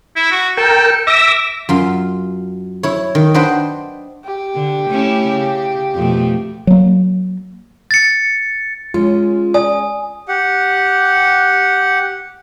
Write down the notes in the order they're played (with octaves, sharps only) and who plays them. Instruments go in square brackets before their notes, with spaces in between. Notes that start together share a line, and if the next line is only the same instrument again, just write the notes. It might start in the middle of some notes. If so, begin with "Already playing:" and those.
[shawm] E4
F#4
[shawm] A4 [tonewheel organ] A#4 G5
[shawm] E5 [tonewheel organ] D6 E6 A#6
[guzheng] F#2 F4 C6
E4 C#5
D#3
D4 B4 C5 D#5 F#5 G5
[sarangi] G4
[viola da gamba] D3
A3 C#4 E4
C#3
F2 B2 A3
[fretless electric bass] F#3 A#3
[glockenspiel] A6 C#7
[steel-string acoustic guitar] G#3 C#4 [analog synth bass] F4
[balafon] D5 [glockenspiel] G#5 D#6
[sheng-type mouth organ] G4 F#5